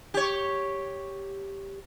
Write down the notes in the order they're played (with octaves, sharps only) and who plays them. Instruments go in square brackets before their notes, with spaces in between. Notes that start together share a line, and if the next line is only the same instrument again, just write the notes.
[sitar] G4 C#5